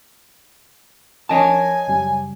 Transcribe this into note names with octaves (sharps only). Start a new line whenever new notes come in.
F3 C#4 A#4 C#5 D#5 G#5 A5
F#2 C#3 G3